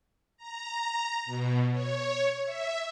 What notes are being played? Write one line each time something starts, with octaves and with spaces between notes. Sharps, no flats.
A#5
B2
C#5
E5